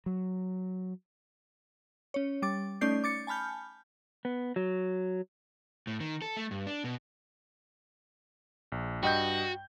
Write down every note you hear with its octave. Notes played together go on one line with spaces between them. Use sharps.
F#3
C#4 C#5
G3 D6 A6
A3 C#4 D#4 D5 G6 C7
D6 A6 C#7
G#5 A5 B5 F6 G6
B3
F#3
A2
D#3
A4
A3
G2
D4
B2
A#1
G2 F#4 D#5 G5 G6